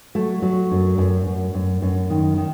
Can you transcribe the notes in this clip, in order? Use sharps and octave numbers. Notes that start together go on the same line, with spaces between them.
F#3 A3
F#3
F#2
F#2
F#2
F#2
F#2
D#3
D#3